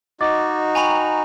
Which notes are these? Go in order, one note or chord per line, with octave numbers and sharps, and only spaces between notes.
D#4 F#4 D#5 D6 A6
G5 G#5 A#5 B5 C#6 F7